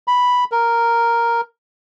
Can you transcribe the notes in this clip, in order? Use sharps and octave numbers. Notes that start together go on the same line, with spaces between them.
B5
A#4